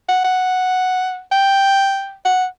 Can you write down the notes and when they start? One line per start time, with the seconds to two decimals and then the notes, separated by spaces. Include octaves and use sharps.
0.09 F#5
0.24 F#5
1.32 G5
2.25 F#5